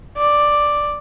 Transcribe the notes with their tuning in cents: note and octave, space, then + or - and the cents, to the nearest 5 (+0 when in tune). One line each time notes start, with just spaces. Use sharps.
D5 +5